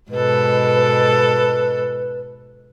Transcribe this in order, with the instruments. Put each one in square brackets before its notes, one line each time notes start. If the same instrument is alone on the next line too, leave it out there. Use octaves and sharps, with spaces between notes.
[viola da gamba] G#2 B2 A4 [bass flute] B4